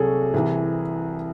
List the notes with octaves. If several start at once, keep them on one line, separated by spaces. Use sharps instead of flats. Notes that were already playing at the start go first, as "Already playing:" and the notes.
Already playing: C2 C3 F#3 F#4 G#4 A4
C2 C3 E3